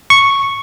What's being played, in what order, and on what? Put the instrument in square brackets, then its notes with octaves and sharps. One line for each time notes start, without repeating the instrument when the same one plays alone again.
[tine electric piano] C#6